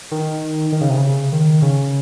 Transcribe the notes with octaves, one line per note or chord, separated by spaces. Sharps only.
D#3
D#3
C#3
C3
C#3
D#3
C#3